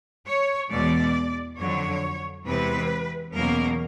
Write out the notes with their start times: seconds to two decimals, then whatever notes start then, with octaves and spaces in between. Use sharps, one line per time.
0.26 C#5
0.71 E2 B2 G#3 D5
1.58 F2 D3 F#3 C#5
2.46 E2 C3 E3 G#3 C4 B4
3.34 E2 B2 F#3 A#3 C#4 A#4